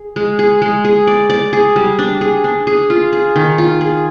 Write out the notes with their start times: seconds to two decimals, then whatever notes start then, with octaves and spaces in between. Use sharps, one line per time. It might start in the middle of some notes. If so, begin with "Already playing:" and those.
Already playing: G#4
0.16 G#3
0.39 G#4
0.62 G#3
0.85 G#4
1.07 D5
1.30 D5
1.53 G#4
1.76 G3
1.99 D4
2.21 G#4
2.44 D4
2.67 G#4
2.90 F4
3.13 G#4
3.36 D#3
3.58 F4
3.81 G#4